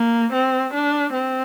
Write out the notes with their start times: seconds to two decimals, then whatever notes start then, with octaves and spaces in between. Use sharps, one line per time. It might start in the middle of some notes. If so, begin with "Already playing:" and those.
Already playing: A#3
0.33 C4
0.74 D4
1.14 C4